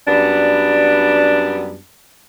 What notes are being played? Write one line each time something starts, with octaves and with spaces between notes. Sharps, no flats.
F#2 G3 B3 D4